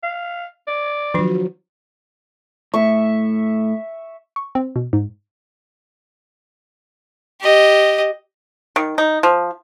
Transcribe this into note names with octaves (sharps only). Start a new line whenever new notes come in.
F5
D5
D#3 F3 F#3 D4
A2 E5 C#6
C#6
C4
B2
G#2
G4 D#5
D#3
D#4
F3